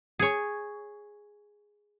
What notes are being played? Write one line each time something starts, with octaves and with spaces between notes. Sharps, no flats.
G#4 C#5